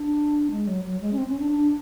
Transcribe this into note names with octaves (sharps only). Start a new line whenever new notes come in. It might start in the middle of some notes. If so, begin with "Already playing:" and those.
Already playing: D4
G#3
F#3
F#3
G#3
C#4
C4
C#4
D4
D4